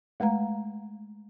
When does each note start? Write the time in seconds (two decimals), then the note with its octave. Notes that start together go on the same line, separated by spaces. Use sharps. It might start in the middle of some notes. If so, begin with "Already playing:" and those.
0.20 G#3 A3 B4 F5 A#5